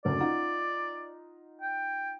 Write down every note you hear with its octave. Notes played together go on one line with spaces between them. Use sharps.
F#1 D2 D5
D#4 F4 F#5
G5